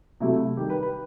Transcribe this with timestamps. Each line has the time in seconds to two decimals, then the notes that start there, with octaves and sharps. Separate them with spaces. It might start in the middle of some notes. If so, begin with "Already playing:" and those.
0.20 C3 F#3 A3 E4
0.57 D#3 G3 G4
0.70 B4
0.83 B4